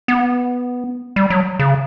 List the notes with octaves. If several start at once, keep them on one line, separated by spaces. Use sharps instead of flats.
B3
G3
F#3
C#3